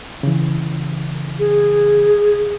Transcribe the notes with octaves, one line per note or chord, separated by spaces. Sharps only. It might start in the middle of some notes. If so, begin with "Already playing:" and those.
C#3 E3
G#4